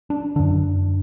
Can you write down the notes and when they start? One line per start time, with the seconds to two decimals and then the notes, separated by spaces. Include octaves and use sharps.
0.10 D4
0.36 F#2 D3 D4